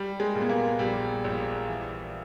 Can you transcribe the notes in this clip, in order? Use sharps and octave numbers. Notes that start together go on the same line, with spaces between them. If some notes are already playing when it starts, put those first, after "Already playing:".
Already playing: G3
G#3
A#2
B3
A#3
A#1 G3
A#1
E3